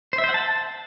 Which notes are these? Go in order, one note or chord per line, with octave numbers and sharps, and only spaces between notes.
C5
E5
C5
F#5
A5